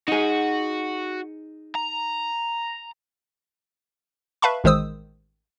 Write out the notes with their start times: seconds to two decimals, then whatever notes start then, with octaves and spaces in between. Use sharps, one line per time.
0.08 D#4 F#4 G#4
1.75 A#5
4.42 B4 E5 F5 A5 B5 C#6
4.64 A1 D#3 G#3 C5 D#6 E6